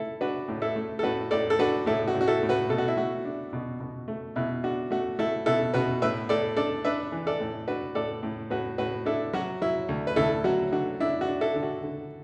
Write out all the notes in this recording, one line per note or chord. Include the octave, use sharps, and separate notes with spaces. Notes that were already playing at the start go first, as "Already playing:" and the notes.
Already playing: A3 E4 A4
D4 F#4 B4
A2
E4 A4
A3
A4
A2 F#4 B4
A2 A4 D5
A4
D4 F#4 B4
A2 E4 A4
F#4
A2
F#4
E4 A4
A2
F#4 B4
B2 A4
F#4
E4
A3 F#4
D4
B2
B2
A3
B2 E4
D4 F#4
A3 F#4
A3 E4 A4
B2 E4 A4
B2 F#4 B4
A2 B4 E5
A2 A4 D5
D4 A4 D5
D4 B4 E5
E3
A4 D5
A2
D4 F#4 B4
A2 A4 D5
A2
A2 F#4 B4
A2 F#4 B4
D4 E4 A4
F#3 F#4
F#3 E4
D2
B4
D2 E4 A4
F#3 F#4
D3 F#4
D4 E4
F#4
D4
E4 A4
D3
F#4
D3